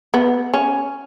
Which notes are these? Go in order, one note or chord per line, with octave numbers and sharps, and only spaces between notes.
B3
C#4